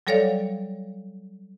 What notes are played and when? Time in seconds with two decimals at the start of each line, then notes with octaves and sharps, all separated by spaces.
0.07 F#3 G3 A4 C#5 D5 F5